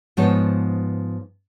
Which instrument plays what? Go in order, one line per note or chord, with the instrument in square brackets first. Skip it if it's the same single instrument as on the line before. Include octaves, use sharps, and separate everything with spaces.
[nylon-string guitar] G#2 F3 B3 D#4 C#5 A5